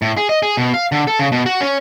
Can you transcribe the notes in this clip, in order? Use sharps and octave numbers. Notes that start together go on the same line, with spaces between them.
A2
G#4
D#5
G#4
B2
F5
D3
A4
C#3
B2
F#4
C#4